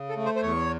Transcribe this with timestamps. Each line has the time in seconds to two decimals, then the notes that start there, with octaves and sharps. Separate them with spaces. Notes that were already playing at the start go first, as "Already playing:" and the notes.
Already playing: C#3
0.09 A4
0.17 A3
0.25 C5
0.36 C5
0.42 E2 C#5